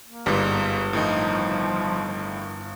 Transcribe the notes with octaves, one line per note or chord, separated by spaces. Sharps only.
A#3
G1 G#2 G3
A2 D#3 F3 D#4